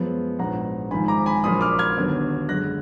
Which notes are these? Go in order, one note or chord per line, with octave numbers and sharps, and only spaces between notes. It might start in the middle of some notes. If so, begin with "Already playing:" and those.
Already playing: F#2 F3 G#3 B3
A#1 G#2 F#3 B3 F#5 A#5
G#1 G#2 F3 G#5 B5
A#5 D6
G#5 B5
A#1 A#2 F#3 A#3 B5 D#6
D6 F6
F6 G#6
D#2 D3 F#3 B3
F#2 D3 G#3 F#6 A#6